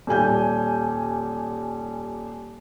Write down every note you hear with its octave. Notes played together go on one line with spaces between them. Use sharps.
D#1 G3 G#5 G6